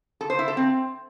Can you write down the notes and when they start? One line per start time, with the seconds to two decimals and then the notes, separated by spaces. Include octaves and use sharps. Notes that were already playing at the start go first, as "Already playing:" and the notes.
0.21 A4
0.30 C5
0.39 E4
0.48 A4
0.57 C4